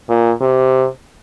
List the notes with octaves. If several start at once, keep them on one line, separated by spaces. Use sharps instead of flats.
A#2
C3